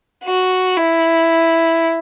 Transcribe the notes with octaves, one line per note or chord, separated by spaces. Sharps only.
F#4
E4